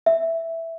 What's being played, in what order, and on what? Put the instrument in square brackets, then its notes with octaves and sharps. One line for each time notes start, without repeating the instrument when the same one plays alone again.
[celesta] E5